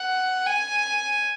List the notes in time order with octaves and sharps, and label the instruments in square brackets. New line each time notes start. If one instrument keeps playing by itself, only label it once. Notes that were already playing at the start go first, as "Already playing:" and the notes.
Already playing: [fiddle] F#5
G#5